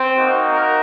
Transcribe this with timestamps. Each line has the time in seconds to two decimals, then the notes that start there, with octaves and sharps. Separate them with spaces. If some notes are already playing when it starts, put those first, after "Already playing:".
Already playing: C4 C5
0.16 A#3 D#4 F#4
0.51 A#4